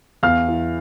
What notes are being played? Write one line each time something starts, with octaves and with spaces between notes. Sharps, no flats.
E2 F5 F6
E3